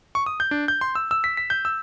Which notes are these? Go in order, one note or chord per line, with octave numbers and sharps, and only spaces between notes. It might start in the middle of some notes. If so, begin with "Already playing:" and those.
C#6
D#6
G6
D4
G6
C6
E6
E6
B6
B6
G6
E6